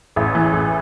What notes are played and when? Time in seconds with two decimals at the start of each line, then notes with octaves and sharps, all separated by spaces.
0.16 A1 E5
0.35 E3
0.53 A1